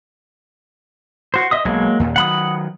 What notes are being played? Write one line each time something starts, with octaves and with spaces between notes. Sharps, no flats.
F#4 C5
D#5 E5 D#6
B1 F#3 G#3 A#3
D#2 A#2
D#3 F#3 F#5 B5 D#6